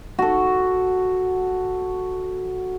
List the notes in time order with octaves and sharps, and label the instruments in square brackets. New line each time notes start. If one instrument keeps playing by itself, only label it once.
[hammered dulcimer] F#4 A4